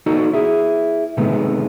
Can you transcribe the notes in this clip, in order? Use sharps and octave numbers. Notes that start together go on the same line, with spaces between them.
D#4 F#4 A4 D5
E4 G#4
A2 C3 D#3 G#3 A3 B3